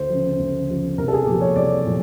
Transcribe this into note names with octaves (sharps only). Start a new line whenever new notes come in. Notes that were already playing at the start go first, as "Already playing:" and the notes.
Already playing: D2 C5
C#3 F3
D2
C#3 F3
C2 A#4
A4
G#4
A#2 F3 G4
C#5
C2 D5
A#2 F3